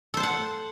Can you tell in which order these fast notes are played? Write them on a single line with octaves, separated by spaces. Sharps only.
A4 C5 A5 F#5